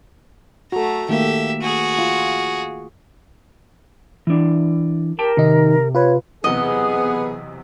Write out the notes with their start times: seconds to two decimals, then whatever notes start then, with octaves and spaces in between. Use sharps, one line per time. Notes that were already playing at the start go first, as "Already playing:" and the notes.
0.72 A3 F#4 A4 A#5
1.09 D#3 A3 A#3 G4 E5
1.61 F#4 G#4
1.99 F4
4.27 E3 D4
5.19 G4 A#4 G5 A5
5.37 C3 D#3 D#4
5.95 F4 B4 C#5
6.44 B1 E2 C3 B3 G#4 D#5